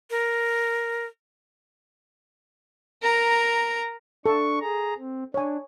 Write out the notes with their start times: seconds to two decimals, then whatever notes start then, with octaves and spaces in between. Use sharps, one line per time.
0.10 A#4
3.02 A#4 A#5
4.26 D4 A4 C#6
4.61 G#4 A#5
4.98 C4
5.34 D4 C#5 G#5